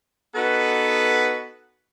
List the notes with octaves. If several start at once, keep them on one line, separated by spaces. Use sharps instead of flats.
B3 D#4 F#4 A4 B4